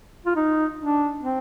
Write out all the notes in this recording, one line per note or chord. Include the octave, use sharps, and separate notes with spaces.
F4
D#4
D4
C4